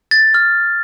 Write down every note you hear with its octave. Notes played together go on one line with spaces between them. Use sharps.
A6
F6